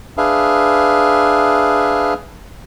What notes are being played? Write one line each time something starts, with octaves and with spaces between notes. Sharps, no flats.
D4 G#4 B4 E5 F5